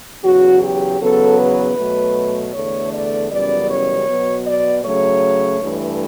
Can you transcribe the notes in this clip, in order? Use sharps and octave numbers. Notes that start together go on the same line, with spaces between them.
E2 C#3 F#3 F#4
G4
E2 C#3 F#3 B3 A4
B4
B2 F#3 A3
E2 D3 A3 C#5
D5
F#2 C#3 E3 G3 B3 D5
C#5
B2 F#3 B3
D5
C#3 F#3 A3 C#5
G2 E3 A3